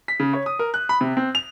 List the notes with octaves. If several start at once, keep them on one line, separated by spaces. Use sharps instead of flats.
B6
C#3
C#5
D#6
A#4
F#6
B5
C3
C4
F7